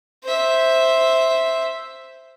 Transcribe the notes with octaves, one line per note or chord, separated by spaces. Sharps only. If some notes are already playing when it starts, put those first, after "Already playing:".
C5 E5